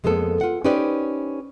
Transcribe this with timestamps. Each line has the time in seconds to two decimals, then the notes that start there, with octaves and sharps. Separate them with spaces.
0.04 F2 G#3 A#3 B3 A4
0.41 F4 F#5
0.64 C#4 D#4 G4 B4 C5 D5